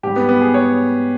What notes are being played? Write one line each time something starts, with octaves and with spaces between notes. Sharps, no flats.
G#2 G3 G4
B3
B3
G#4
C#5